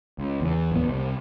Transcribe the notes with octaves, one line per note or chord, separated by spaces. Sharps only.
C#2
E2
D1 E2 B3
C2